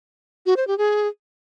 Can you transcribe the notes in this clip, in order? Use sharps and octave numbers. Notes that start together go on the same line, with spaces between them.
F#4
C5
G4
G#4